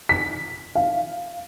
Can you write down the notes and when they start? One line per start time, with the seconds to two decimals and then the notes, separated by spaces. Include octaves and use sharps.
0.09 B6
0.75 F5